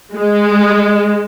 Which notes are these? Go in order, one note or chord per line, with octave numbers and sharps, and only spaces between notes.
G#3